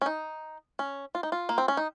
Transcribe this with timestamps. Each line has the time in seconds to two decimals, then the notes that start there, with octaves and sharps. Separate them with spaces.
0.02 C#4
0.06 D#4
0.79 C#4
1.15 F4
1.23 D#4
1.32 F4
1.49 A#3
1.58 C4
1.68 C#4
1.77 D#4